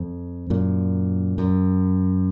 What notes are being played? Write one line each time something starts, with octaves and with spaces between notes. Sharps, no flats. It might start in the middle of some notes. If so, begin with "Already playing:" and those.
Already playing: F2
F#2 A#2
F#2